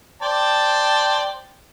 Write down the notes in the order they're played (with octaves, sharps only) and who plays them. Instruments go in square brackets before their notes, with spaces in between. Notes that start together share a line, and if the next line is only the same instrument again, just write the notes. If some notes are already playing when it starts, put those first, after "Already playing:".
[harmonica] C5 D5 G5 [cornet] A5